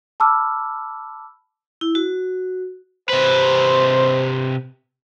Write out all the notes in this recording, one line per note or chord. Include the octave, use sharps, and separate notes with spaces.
A5 B5 D6 E6 F6
E4
F#4
C3 B4 C5